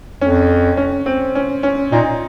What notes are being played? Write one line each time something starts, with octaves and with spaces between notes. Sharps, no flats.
F2 C#4
C#4
C4
C#4
C#4
A#2 D#4